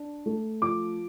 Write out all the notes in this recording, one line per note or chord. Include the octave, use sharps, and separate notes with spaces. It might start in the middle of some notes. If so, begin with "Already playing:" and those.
Already playing: D4
A3
F3 D6